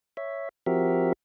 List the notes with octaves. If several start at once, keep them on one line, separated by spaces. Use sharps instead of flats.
C#5 E5
F3 C4 F#4 G4 A#4 E5